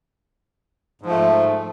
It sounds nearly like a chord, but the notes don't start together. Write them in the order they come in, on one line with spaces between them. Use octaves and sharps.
G#2 F3 A3